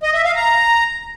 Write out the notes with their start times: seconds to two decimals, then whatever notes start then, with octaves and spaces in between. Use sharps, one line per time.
0.03 D#5
0.14 E5
0.25 F5
0.36 A#5